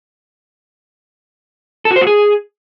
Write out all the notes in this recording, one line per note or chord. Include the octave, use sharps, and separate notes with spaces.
A4
F#4
C5
F#4
G#4